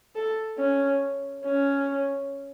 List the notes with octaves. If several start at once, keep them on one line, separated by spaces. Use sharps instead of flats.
A4
C#4
C#4